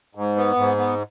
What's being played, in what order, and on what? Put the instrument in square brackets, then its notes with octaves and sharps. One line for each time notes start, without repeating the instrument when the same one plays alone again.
[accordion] G#2
B3
G#2
B3